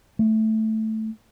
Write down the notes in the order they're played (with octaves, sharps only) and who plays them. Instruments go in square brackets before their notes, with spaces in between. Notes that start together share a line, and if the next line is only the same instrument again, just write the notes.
[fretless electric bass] A3